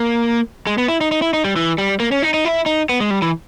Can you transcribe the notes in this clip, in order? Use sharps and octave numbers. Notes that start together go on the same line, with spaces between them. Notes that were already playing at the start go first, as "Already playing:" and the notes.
Already playing: A#3
G#3
B3
E4
D#4
D#4
E4
D#4
G3
E3
G3
A#3
C#4
D#4
D#4
E4
D#4
B3
G#3
G3
E3